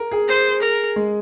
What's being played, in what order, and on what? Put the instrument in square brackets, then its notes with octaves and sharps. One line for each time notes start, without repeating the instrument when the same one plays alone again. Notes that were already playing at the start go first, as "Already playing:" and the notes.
Already playing: [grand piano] A#4
G#4
[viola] C5
A#4
[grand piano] G#3